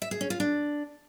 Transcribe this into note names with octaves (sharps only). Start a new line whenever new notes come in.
E5
G#4
C#4
F4
D4